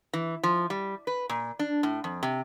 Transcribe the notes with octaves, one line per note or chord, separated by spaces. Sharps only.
E3
F3
G3
B4
A#2
D4
A2
F2
C3